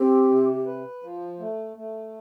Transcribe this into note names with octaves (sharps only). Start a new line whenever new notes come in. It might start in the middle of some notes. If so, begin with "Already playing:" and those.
Already playing: C4 G4
C3
B4
F3
A3
A3